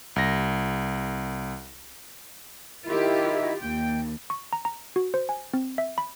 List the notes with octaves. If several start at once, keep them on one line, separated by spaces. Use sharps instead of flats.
C2 A#6
D#3 E4 F4 G4
D#2 G5
C#6
A#5
A#5
F#4
C5
G#5
C4
E5
B5